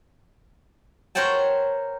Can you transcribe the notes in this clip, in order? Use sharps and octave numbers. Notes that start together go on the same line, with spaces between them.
A#4 C5 C#5 F#5 G5 A5